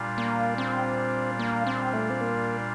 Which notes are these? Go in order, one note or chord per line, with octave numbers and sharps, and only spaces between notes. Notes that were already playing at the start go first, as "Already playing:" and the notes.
Already playing: A#2 G3 D4 F4
A#3
C4
A#3
C4
A3
C4
A#3